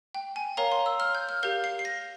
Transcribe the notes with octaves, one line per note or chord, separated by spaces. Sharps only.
G5
G#5
A#4 C#5 F5 A#5
C6
E6
F6
G6
F6
G4 A#4 F5 G6
C7
C7
A#6